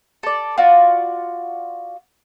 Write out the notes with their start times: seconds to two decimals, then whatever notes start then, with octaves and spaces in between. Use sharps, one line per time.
0.23 A4 D5
0.58 F4 F#4 D5